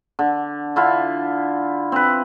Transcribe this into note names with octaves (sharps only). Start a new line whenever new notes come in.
D3
D3 E4 F4
C4 B4